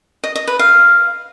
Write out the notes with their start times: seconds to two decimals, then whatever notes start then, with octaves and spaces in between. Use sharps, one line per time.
0.24 D#5
0.36 D#5
0.47 B4
0.59 F5